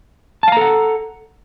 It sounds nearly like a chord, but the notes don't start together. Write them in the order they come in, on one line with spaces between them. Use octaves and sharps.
A5 F5 A#5 A4 F#5